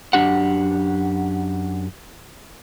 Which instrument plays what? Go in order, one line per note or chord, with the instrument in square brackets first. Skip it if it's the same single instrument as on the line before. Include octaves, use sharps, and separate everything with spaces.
[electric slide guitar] F#2 D4 G4 F#5